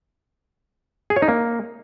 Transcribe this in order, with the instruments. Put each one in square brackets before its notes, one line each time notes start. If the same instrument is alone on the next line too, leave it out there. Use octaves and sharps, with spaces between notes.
[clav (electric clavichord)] G#4
C#5
D#4
A#3